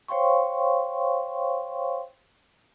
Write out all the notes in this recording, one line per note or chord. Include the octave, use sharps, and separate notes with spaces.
C5 C#5 F5 G5 C6 C#6